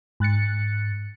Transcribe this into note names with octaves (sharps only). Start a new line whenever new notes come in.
G#2 F#6 A6 C#7